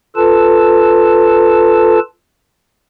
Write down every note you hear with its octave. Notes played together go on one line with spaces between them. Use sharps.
F4 A4 B4 A5